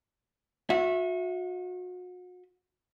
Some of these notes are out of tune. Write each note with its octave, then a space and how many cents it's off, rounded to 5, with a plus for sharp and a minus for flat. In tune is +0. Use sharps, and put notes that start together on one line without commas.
F#4 -35 E5 +0